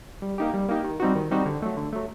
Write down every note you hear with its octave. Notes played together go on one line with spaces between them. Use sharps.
G3
A#3 D#4 G4
G3
A#3 D#4 G4
D#3
G3 C4 D#4 F#4
D#3
G3 C4 D#4 F#4
D3
F#3 A3
D3
F#3 A3